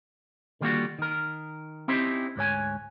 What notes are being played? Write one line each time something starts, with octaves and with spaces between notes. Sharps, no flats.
D3 D#3 G3 A#3 F4 F#4
D#3 A#4
C4 C#4 D#4 E4 G4 C5
D2 G#2 C#5 G#5